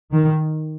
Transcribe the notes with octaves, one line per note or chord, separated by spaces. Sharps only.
D#3